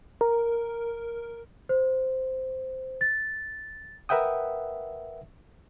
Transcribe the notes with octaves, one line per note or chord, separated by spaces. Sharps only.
A#4
C5
A6
A#4 B4 E5 F#5 G5 D#6